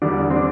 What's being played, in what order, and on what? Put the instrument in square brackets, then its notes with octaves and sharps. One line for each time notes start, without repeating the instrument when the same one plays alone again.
[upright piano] E2 D3 G3 [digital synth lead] D4
[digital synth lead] C4
D4